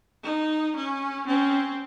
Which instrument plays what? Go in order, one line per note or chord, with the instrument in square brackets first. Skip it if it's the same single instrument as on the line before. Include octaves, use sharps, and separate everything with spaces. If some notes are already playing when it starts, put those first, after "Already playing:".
[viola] D#4
C#4
[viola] C4 [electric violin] C#4